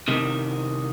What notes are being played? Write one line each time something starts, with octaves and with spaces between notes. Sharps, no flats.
C2 C3 D#3